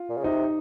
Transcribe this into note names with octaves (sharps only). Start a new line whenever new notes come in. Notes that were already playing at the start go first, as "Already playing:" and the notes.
Already playing: F4
A#2
C#3
C3 D#4